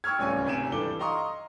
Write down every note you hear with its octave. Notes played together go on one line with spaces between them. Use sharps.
G5 C#6 E6 F6 G#6
D1 C#2 G3 C#4 G#5 C#6
G#1 C3 G#5 D7 E7
G2 E3 D4 A4 D6 G7
D#5 F5 A#5 C6 C#6 D#6